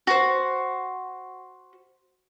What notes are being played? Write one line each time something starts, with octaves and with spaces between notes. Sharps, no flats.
F#4 C5